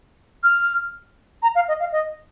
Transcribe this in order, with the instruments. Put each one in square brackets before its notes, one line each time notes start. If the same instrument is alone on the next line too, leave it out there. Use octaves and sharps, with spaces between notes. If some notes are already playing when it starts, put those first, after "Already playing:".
[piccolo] F6
A#5
F5
D#5
F5
D#5